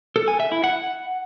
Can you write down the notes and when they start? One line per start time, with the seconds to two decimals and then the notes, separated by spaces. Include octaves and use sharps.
0.16 A4
0.28 G#5
0.40 E5
0.52 E4
0.64 F#5